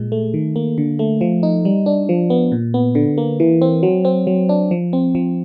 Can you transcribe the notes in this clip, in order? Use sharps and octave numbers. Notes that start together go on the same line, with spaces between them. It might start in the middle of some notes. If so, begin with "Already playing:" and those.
Already playing: A#2 G#3
A3
D#3
A#3
D3
A3
F3
D#4
G3
D4
F3
B3
A#2
B3
D3
A#3
E3
C4
F#3
C4
F#3
D4
F3
C4
F3